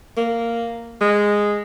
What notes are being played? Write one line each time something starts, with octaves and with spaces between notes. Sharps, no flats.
A#3
G#3